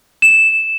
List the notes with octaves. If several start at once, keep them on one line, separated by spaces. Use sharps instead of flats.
E7